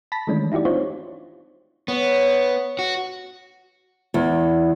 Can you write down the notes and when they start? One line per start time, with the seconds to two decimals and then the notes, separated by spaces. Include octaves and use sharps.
0.12 A5 B5 A#6 B6
0.27 D#3 E3 G#3 A3 C#4 D4
0.52 D#4 E4 F#4 G4 D5
0.65 C4 D4 D#4 F4 C5 C#5
1.88 B3 C#5
2.79 F#4
4.14 E2